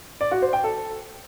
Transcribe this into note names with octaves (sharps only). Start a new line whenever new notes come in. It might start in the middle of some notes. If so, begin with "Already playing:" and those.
D5
F#4
C5
G5
A4